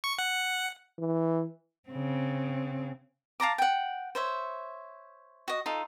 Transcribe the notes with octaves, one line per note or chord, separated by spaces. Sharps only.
C#6
F#5
E3
C#3 C4
F5 A5 A#5 D6
F#5 G5
C5 C#5 E5
F#4 D#5
D#4 F4 A4